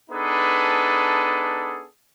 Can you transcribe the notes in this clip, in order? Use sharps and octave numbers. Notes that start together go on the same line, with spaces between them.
B3 D4 D#4 G#4 A4 B4